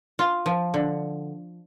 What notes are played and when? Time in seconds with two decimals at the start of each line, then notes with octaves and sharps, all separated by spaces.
0.19 F4
0.46 F3
0.74 D3